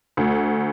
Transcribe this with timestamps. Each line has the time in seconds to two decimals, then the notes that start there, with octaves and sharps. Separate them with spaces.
0.17 D2